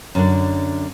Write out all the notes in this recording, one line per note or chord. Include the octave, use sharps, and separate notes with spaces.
F#2 D3 D4